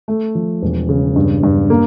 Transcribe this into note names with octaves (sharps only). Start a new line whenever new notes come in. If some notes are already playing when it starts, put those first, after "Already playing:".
A3
F3
E1
C#3
G2
G2
A#3